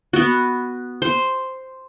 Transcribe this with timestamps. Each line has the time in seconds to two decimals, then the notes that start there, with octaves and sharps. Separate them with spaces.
0.13 B3 F#4
1.02 C5